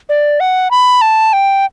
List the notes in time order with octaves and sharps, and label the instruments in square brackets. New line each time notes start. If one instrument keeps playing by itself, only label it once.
[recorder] D5
F#5
B5
A5
G5